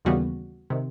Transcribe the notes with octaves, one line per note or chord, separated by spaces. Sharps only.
D#2 C#3 E3 G3 B3 F#4
C3 D#3